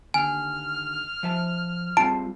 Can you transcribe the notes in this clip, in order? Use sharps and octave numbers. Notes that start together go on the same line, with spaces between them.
D#2 D3 G#5 F6
F3 E5 A5
G3 C4 F4 A5 D7